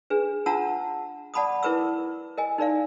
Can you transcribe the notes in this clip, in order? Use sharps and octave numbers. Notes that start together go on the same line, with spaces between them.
D4 G#4 B4
D4 F4 F#5 A5 A#5 E6
D5 F#5 A5 B5 D6 D#6
E4 A#4 B4 D6 E6
A#4 D#5 G#5
D#4 A#4 D5 F5